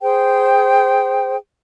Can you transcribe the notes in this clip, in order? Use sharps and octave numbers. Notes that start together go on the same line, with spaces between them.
G#4 C5 G5